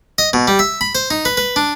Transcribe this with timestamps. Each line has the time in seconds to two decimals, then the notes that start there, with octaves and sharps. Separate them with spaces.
0.18 D#5
0.33 B2
0.48 G3
0.59 E5
0.81 B5
0.95 C5
1.10 D#4
1.25 B4
1.37 B4
1.56 D4